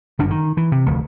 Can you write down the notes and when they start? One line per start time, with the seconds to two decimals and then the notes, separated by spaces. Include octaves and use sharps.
0.19 G1 F#2 D4
0.30 D#3
0.57 E3
0.72 C3
0.86 F1 D2